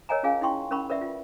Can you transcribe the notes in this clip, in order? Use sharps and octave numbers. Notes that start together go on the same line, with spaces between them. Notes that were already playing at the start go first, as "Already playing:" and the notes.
A#4 C#5 D#5 F#5 G#5 A#5
C#4 F4 G#4 F5 G#5
D#4 E4 G5 C6 C#6
C#4 A#4 B5 C#6
A#4 B4 D5 E5 F#5
F4